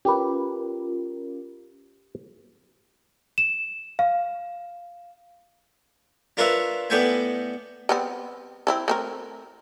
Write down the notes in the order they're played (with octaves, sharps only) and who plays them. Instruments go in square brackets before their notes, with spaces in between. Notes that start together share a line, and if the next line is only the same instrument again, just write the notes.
[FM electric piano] C#4 F4 A#4 [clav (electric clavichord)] G4 B4
[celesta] E7
F5
[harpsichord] D4 F4 A#4 B4 C#5 E5
A2 B3 D4 G5 G#5
[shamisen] G3 B3 C4
C4 E4 A4
A3 C4 A#4